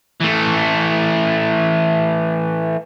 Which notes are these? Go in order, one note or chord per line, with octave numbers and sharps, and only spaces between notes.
E3 A3